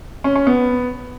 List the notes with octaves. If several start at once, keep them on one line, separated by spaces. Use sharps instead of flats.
C#4
C#4
B3